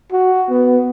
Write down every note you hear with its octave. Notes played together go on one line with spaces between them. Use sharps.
F#4
B3